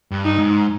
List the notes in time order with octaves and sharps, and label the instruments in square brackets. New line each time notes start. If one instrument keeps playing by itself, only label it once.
[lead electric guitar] G2
[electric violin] D#4
[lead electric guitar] G#2